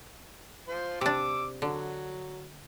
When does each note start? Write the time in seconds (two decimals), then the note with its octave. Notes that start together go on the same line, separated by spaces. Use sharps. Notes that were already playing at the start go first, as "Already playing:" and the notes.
0.68 F4 C5
1.01 C3 D4 D6 E6
1.62 D3 F#3